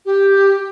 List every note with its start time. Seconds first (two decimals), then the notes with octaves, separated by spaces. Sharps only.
0.05 G4